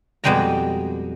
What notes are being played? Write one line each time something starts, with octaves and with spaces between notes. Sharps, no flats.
F2 B2 G3 G#3 G5 A#5